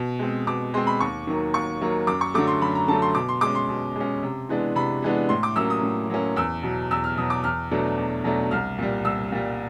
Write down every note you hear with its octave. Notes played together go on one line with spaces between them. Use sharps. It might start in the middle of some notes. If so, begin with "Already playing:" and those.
Already playing: B2
G#3 C4
B2 D6
G#3 C4 C6
B5
D#2 C#6
D#3 F#3 A#3
D#2 C#6
D#3 F#3 A#3
F#2 D6
C#6
D3 F#3 A3 D6
C6
F#2 B5
A#5
D3 F#3 A3 A5
C6
B2 D6
C6
G#3 C#4 D6
C6
B2
G#3 C#4
C3
E3 G#3 B3 D4
C3 B5
E3 G#3 B3 D4
A2 C6
D6
F#3 A#3 C#4 E6
D#6
A2
F#3 A#3 C#4
E2 E6
B2 F#3
E2 E6
F6
B2 F#3 D#6
D6
E2 F6
B2 F#3 A3 D4
E2
B2 F#3 A3 D4
C2 F6
A#2 G3
C2 E6
A#2 G3